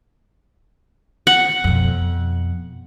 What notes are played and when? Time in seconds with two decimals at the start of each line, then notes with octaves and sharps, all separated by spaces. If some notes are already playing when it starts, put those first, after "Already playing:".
1.27 F#5
1.64 F2 B2